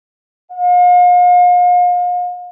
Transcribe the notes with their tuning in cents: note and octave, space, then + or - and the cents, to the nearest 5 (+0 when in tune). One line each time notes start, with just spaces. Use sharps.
F5 +40